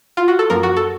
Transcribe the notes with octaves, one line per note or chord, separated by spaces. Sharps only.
F4
F#4
A4
F#2 F3 A#3 A#4
F#4
A4